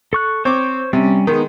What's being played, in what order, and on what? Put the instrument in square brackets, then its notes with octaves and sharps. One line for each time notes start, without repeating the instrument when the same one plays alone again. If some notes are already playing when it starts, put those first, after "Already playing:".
[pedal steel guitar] A4 C#6 F#6
[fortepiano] C4 D6 [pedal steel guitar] C5 C#5 C#6
[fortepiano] C3 [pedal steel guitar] G3 C#4
[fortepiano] D#3 G#3 [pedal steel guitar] B3 D#4